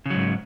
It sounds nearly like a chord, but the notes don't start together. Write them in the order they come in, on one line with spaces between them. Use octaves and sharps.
C#3 F#3 G#2